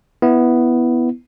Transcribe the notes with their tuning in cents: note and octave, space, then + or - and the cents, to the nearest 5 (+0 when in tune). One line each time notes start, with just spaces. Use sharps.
B3 +0 E4 +0